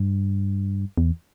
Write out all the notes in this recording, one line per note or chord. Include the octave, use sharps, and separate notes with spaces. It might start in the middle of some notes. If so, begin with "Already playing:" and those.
Already playing: G2
E2